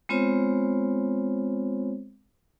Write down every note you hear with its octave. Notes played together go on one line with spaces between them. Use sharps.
G#3 B3 C4 F4 C5 C#5